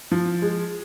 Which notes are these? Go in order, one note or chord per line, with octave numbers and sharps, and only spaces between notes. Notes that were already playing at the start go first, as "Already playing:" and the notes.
F3
G#3